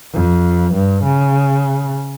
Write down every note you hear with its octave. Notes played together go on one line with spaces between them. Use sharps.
F2
G2
C#3